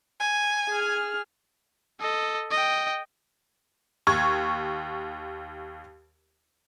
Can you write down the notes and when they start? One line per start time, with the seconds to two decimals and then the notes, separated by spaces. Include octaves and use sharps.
0.20 G#5
0.69 G#4 F6
2.00 A4 D#5
2.51 D#5 G5
4.07 D#2 C#6 G#6